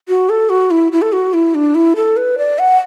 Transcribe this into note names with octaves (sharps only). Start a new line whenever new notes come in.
F#4
A4
F#4
E4
E4
A4
F#4
E4
D4
E4
A4
B4
D5
F#5